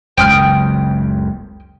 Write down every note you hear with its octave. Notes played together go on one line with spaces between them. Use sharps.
F#1 C#2 F#2 G5 D#6 F6